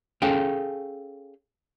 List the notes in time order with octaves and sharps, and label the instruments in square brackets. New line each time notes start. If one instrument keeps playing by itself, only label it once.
[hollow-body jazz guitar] C#4 G#4 A4 F5 G5